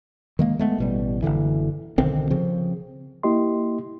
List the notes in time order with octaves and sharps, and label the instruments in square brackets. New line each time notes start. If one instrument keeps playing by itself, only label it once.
[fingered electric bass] D#3 G#3 A#3
G#3 A3 B3
A1 B2 G3
F#1 C2 D3 E3
B1 D3 D#3 C4
C#3 F3 C4
[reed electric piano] A#3 E4 G4 D#5 C6